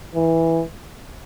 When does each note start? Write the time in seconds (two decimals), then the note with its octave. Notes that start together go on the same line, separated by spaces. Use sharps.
0.15 E3